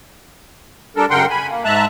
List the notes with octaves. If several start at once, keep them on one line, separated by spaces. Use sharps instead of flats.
G3 D4 A4 A#4
F#2 C#3 A#4 F#5 G5 C6
G#5 B5
A#3
G#2 G#3 E5 A5 A#5 F#6